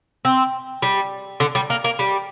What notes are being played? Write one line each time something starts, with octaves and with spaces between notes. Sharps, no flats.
C4
G3
D3
G3
A#3
A#3
G3